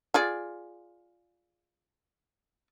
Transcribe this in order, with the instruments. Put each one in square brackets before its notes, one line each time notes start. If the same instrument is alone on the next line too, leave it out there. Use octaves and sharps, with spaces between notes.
[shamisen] F4 G#4 D5